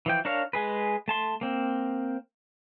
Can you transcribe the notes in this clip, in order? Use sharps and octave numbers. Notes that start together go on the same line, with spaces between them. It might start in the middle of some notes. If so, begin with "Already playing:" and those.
E3 F3 G5
D4 A#4 C#5 F5
G#3 G#4 B4
A3 A5 C6
A#3 C4